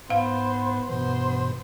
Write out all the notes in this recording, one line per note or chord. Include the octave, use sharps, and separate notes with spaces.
G#2 B3 C5 F5
G2 B2 E3 B3 C5